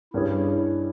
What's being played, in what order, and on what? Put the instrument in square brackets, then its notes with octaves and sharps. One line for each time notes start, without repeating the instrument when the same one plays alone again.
[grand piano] G2 G3 C#4 G#4 [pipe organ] E4